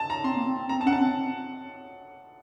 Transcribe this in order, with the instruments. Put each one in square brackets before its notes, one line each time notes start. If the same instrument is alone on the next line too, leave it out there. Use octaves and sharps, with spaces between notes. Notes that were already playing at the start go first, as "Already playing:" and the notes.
Already playing: [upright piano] A5
A#5
[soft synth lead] C4 [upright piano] C6
[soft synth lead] A#3
C4
C4
[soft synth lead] C4 [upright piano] A#5
[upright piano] A5
[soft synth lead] C#4 [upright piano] F#5
[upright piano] A5
[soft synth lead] C4